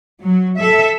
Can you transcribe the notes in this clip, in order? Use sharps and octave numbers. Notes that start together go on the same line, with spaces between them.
F#3
A4 E5